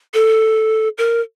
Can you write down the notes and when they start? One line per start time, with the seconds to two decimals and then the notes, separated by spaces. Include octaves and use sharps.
0.14 A4
0.98 A#4